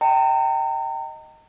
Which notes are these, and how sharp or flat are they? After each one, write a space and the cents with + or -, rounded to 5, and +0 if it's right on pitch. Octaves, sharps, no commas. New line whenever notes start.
D#5 +0 G5 -20 A#5 -35